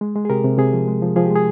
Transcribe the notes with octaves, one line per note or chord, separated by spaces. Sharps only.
G#3
G#3
G#4
C3 G4 A#4
C3
C3 G#4
F3
G#3
F3
F3 G#4
G#3 G4
G#4